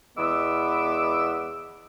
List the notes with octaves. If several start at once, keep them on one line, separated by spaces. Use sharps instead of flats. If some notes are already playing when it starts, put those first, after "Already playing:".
E2 G#3 B3 D6 E6